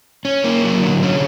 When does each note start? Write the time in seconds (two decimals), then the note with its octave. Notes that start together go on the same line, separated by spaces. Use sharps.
0.25 C#4
0.44 A#3
0.64 F#3
0.82 D3
1.02 C#4